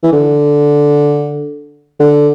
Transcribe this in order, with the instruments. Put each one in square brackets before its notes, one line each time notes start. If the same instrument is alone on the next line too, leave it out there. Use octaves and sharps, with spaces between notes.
[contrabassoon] E3
D3
D3